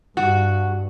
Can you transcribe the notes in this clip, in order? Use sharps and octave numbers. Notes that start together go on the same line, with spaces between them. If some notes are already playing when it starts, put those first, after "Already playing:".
G2 F#4